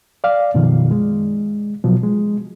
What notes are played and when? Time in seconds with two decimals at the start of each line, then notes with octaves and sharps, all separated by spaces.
0.24 D5 F5
0.54 F#2 B2 D#3 F3
0.91 G#3
1.84 B2 F3 F#3
2.03 G#3